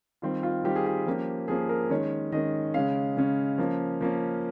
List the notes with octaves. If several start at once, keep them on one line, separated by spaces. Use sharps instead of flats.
D#3 G3 C4 F4
F4
D#3 G3 C4 G4
G#4
G4
F3 A#3 C#4
F3 A#3 C#4 G#4
A#4
D#3 G#3 C#4 C#5
D#3 G#3 C#4 D#5
C#3 G#3 C#4 F5
C#3 G#3 C#4
F3 A#3 C#4
F3 A#3 C#4